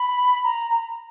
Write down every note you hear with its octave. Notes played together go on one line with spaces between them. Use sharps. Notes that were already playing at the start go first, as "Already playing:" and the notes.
Already playing: B5
A#5